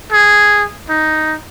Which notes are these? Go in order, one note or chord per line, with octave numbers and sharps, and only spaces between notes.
G#4
D#4